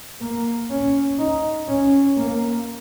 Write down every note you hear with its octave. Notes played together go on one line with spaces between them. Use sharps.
A#3
C#4
D#4
C#4
A#3